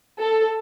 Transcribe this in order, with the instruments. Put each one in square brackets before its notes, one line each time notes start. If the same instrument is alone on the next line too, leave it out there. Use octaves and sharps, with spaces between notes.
[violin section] A4